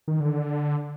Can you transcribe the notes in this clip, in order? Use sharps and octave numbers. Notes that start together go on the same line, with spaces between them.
D#3
D3